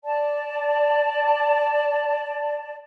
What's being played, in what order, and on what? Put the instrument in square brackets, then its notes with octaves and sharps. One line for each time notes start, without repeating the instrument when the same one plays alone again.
[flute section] D5 A5